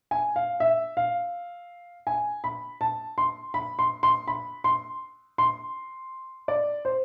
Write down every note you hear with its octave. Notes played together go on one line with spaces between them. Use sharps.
G#5
F5
E5
F5
G#5
B5
A5
C6
B5
C6
C6
B5
C6
C6
D5
C5